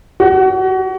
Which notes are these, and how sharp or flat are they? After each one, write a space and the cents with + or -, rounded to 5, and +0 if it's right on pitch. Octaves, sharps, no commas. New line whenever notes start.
F#4 +30